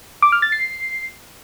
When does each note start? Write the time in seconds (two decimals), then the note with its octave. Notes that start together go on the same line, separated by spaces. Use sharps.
0.22 D6
0.32 F6
0.42 A6
0.52 C7